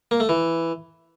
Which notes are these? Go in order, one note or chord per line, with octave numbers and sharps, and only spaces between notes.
A#3
A3
E3